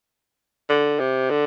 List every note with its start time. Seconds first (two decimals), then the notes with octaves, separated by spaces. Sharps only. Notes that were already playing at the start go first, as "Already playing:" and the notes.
0.70 D3
1.00 C3
1.30 D3